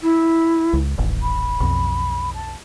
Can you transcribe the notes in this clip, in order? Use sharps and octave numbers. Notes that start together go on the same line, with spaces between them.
E4
C#2
D#1 A1
B5
B1 F2
A5